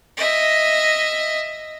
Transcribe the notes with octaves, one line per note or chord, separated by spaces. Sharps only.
D#5 E5